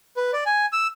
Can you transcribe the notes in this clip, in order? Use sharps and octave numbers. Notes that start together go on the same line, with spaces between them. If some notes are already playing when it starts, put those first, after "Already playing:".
B4
D5
G#5
E6